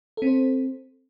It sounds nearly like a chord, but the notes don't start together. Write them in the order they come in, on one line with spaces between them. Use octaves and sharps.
A4 C4 C5